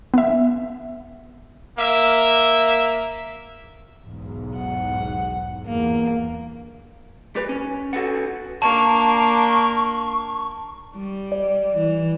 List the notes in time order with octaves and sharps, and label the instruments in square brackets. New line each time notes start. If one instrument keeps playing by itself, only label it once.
[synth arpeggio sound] B3 E5
[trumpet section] A#3 E5
[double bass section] B1 E2 G#2
[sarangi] F#5
[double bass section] E2 G2 [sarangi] A#3
[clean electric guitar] G3 B4
C#4
F#4 A4 B4 F#5
[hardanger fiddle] A#3 D4 [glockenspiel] A5 [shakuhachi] C#6
[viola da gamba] G3
[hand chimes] D5
[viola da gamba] E3